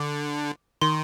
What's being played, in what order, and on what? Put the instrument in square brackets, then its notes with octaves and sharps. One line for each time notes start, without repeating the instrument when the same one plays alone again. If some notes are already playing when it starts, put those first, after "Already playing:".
Already playing: [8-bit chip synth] D3 [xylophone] D6
[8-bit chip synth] D#3 [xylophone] C6